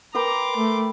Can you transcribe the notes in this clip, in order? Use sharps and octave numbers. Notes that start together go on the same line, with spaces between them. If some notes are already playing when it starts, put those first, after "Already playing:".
A#4 B4 G5 A#5 C6 D6
A3